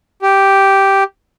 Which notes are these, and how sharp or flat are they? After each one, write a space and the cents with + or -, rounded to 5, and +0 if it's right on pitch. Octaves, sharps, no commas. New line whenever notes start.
G4 -5